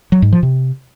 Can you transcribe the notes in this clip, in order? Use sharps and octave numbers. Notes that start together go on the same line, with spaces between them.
F#3
G#2
F3
C3